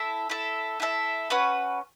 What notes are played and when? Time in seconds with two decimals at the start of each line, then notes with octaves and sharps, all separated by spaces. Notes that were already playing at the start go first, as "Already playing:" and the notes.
Already playing: E4 A4 E5
0.30 E4 A4 E5
0.80 E4 A4 E5
1.30 C#4 F#4 B4